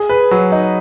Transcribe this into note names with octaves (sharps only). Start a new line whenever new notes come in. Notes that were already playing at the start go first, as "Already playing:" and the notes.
Already playing: G#4
B4
F#3
D#4